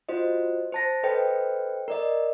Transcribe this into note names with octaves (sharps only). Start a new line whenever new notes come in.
F4 F#4 C5 D#5
C5 A5 A#6
A4 B4 C5 D#5 G5
A#4 D5 D#5